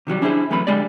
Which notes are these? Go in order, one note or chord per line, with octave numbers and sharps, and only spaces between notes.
C3 D#3 F#3 G3
C#4 D4 E4 F4 G#4 C5
E3 F#3 A3 B3 C4 B5
D3 G#3 G4 D5